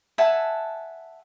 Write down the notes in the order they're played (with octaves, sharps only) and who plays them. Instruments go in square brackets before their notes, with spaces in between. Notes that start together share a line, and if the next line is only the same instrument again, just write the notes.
[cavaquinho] E5 F#5 G#5 A5